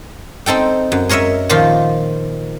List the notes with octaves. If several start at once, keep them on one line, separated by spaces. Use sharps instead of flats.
C4 D#4 A4 G5
F#2
G#4 A#4 C#5 D#5 E5
A#2 D#3 F3 F4